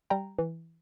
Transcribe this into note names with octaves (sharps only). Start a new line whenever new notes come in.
G3 G5 A#5
E3